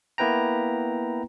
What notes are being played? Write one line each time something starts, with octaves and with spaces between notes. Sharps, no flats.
A#3 B3 E4 B4 G5 A#5